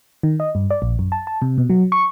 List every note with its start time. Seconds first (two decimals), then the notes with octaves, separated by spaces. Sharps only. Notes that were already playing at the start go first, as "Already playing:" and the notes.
0.23 D#3
0.40 D#5
0.55 G2
0.71 D5
0.82 A#1
0.99 F#2
1.12 A5
1.27 A5
1.42 C3
1.58 B2
1.69 F#3
1.92 C#6